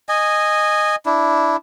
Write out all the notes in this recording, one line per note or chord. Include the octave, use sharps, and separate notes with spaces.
D#5 G#5
D4 E4